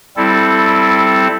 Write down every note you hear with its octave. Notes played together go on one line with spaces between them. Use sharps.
G3 C4 E4 A4